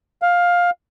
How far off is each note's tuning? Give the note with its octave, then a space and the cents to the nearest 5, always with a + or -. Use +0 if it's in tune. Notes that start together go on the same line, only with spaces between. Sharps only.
F5 +15